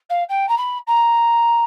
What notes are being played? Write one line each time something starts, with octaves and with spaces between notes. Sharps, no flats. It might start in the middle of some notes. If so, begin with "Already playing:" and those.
F5
G5
A#5
B5
A#5